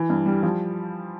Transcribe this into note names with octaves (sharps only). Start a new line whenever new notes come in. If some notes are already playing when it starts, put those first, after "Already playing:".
Already playing: E3
G2
G3
F3